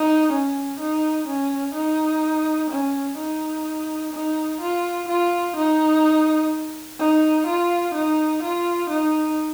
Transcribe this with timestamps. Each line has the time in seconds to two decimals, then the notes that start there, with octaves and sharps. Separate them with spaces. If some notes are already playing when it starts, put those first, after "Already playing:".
Already playing: D#4
0.33 C#4
0.80 D#4
1.28 C#4
1.75 D#4
2.71 C#4
3.18 D#4
4.13 D#4
4.61 F4
5.09 F4
5.57 D#4
6.99 D#4
7.47 F4
7.95 D#4
8.43 F4
8.90 D#4